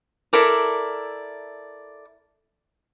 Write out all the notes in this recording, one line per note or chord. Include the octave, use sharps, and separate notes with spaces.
E4 A4 A#4 D5